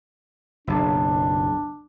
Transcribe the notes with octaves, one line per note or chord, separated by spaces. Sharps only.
F#1 B1 D4